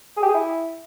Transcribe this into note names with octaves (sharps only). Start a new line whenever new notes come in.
G#4
G4
G#4
E4